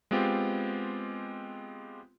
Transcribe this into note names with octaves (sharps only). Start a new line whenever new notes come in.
G#3 B3 C4 F4 G4